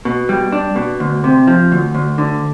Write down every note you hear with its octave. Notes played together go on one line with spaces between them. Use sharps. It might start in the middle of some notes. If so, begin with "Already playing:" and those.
B2
G3
D4
B2
D2
C3
F3
D2
D2
D3